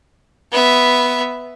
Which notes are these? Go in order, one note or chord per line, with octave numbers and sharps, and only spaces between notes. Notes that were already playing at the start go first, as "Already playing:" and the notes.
B3 E5